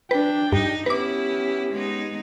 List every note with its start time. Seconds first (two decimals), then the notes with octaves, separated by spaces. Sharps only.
0.11 D4 B4 G5
0.52 G2 D#4
0.86 B3 C#4 E4 G4 B4 D6
1.72 G#3 B3 D#4